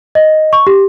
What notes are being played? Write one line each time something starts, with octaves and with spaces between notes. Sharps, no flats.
D#5
C#6
G4